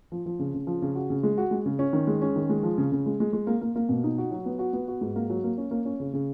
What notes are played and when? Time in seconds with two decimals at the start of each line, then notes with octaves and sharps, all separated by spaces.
0.12 F3
0.26 F3
0.39 C#3
0.54 C#3
0.67 F3
0.82 C#3
0.95 F#4
1.10 C#3
1.23 G#3
1.38 F#4
1.51 G#3
1.66 C#3
1.79 C#4
1.93 D#3
2.07 G#3
2.22 C#4
2.36 D#3
2.49 G#3
2.63 F3
2.78 C#3
2.92 C#3
3.06 G#3
3.20 G#3
3.33 G#3
3.47 A#3
3.61 A#3
3.76 A#3
3.89 B2
4.04 D#4
4.18 F#4
4.31 F#3
4.46 B3
4.59 F#4
4.73 B3
4.88 F#4
5.01 G#2
5.16 A#3
5.30 F#3
5.44 A#3
5.58 C#4
5.71 A#3
5.85 C#4
6.00 C#3
6.13 C#3